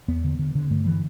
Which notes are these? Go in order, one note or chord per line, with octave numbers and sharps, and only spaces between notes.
E2 B3
D3
D3
D3
G2 A3
D3 E3